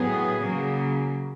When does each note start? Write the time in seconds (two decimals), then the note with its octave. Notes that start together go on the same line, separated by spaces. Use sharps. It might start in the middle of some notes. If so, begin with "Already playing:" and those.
Already playing: A2 F#3 B3 G#4
0.42 C#3 F#3 A#3